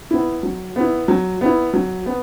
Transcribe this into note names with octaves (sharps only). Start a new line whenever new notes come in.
B3 E4
F#3
B3 E4
F#3
B3 E4
F#3
B3